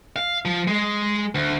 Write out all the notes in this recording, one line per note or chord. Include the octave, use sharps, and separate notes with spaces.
F5
F3
G#3
D2